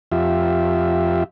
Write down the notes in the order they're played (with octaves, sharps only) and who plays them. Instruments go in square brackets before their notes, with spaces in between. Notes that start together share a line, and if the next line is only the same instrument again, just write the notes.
[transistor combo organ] F2 F4 G4 E5